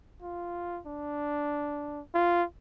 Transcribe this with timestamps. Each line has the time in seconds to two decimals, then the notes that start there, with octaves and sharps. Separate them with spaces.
0.22 F4
0.87 D4
2.15 F4